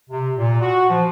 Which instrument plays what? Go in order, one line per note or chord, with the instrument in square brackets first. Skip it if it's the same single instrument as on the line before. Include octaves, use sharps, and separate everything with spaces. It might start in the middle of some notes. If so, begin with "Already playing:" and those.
[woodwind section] C3
A#2
F#4
F3